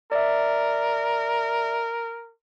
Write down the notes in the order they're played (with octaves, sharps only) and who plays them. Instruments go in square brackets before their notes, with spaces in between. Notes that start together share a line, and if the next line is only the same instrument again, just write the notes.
[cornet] A#4 [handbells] D5 E5